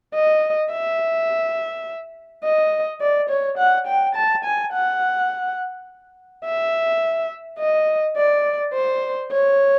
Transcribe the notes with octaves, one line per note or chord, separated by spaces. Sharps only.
D#5
E5
D#5
D5
C#5
F#5
G5
A5
G#5
F#5
E5
D#5
D5
C5
C#5